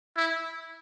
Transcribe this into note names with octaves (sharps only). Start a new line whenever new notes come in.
E4